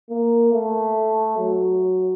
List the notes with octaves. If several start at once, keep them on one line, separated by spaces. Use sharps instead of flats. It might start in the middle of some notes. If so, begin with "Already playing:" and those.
A#3
A3
F#3